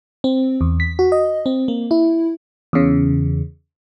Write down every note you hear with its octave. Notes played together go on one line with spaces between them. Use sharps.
C4
E2
B6
F#4
D#5
C4
A#3
E4
E2 C#3